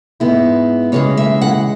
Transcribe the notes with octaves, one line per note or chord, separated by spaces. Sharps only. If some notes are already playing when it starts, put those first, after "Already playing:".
G#2 G#3 B3 E4
C#3 E3 G#3 C#5
E5
F#5